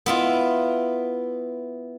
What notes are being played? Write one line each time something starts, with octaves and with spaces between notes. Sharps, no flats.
B3 E4 F4